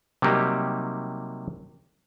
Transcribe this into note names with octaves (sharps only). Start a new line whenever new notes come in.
C3 F#3 G3 A#3 D#4 G4